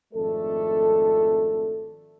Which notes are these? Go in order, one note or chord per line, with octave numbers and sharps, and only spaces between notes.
G#1 F2 A3 D4 A4